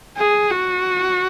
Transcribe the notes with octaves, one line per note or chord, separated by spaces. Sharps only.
G#4
F#4